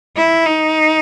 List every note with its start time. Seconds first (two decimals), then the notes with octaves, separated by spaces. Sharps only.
0.17 E4
0.45 D#4